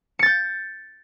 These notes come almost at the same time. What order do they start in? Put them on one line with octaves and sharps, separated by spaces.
C#7 A6 G6